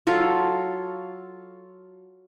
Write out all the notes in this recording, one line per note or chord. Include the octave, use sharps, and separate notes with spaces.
F#3 F4 A4 F5